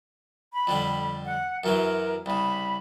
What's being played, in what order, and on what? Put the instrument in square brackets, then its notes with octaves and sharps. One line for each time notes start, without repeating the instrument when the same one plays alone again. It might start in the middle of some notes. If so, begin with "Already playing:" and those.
[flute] B5
[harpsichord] F2 D3 G3
[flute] F#5
[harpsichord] F#2 E3 F#3 [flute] A#4
[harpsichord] C2 C#3 [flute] B5